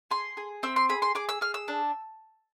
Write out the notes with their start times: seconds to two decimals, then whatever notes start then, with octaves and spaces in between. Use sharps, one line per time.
0.11 G#4 C6
0.37 G#4
0.63 C4 E6
0.76 C6
0.89 G#4 B5
1.02 C6
1.15 G#4 D6
1.29 E6
1.41 G#4 F6
1.54 E6
1.68 D4